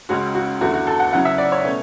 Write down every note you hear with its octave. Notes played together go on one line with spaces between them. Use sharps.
C#2 C#3 G#3 C#4 F#4
F#4
E2 D3 A3 E4 F#4
F#4
A4
F#5
C#3 F#3 C#4 E4 F#5
E5
D5
C#5
B2 A3 C#4